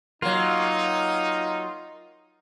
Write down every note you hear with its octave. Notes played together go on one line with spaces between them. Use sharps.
F#3 A#3 D#4 F4